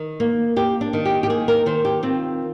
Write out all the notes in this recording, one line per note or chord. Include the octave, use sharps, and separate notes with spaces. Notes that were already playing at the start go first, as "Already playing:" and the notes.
Already playing: D#3
A#3
A#3 G4
D4
D#3
G4
G4
A#3 G#4
A#4
D#3 C5
G4
C4 F4